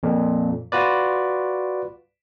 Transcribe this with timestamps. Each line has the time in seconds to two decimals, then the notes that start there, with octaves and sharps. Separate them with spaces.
0.03 F2 A#2
0.72 F4 F#4 B4 D5